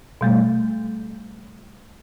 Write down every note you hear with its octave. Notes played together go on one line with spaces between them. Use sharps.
B2 G3 A3